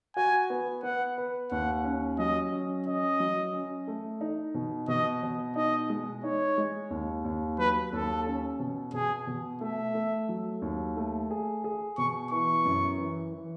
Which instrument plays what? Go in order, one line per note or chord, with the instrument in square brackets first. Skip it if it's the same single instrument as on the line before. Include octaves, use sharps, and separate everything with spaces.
[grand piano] F#4 [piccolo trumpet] G#5
[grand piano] B3
[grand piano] B3 [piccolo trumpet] F#5
[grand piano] B4
[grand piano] D#2 [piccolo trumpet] F#5
[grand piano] C#4
[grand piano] F#3 [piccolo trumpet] D#5
[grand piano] C#4
[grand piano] C#4 [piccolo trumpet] D#5
[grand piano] F#3
C#4
A3
D#4
B2
[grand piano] B2 [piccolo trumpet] D#5
[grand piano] B2
[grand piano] D#4 [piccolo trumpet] D#5
[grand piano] G#3
[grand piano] D#4 [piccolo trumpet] C#5
[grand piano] G#3
D#2
D#2
[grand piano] F#3 [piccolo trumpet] B4
[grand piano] D#2 [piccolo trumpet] A4
[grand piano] C#4
B2
[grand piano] B2 [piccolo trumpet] G#4
[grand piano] B2
[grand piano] A3 [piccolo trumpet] E5
[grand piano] A3
F#3
D#2
A3
G#4
G#4
[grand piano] B2 [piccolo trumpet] C#6
[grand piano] E3 [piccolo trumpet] C#6
[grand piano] F#2
E3
E3